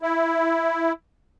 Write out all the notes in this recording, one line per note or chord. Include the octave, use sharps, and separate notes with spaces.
E4